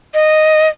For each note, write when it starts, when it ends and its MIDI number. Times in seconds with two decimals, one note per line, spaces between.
0.14 0.68 75